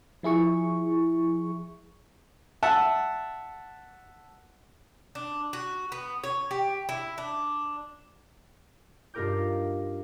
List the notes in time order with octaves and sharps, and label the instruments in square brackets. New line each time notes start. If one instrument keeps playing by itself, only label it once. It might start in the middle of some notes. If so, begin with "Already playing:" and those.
[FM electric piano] F3 E4 G#4 C#6
[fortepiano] E5 F#5 A5
[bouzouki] D4
F#4
B3
C#5
G4
E4
D4
[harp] G2 D#4 F4 A#4 D6 G6